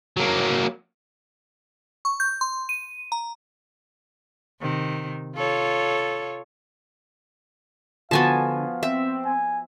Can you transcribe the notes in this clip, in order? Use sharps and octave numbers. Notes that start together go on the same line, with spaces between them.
F#3 A#3
C#6
G6
C6
D#7
A#5
C3 D#3
F4 A4 C#5
D3 F3 B3 F#4 F5 G#5 A5
C4 E5
G#5